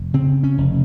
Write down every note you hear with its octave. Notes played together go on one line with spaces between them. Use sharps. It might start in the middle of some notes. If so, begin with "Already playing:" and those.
Already playing: F1
C#3 C4
C#4
F1